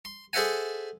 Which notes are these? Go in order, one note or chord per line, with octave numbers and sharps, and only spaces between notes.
C6
G#4 A4 C5 E5 F#5 G#5